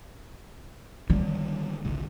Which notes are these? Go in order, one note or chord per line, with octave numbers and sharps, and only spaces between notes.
D3 D#3 G3 G#3
G#1 C#2 G#2